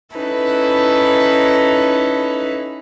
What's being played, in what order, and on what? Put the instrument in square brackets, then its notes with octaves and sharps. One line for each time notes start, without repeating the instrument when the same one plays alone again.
[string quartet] C#4 D#4 E4 A4 B4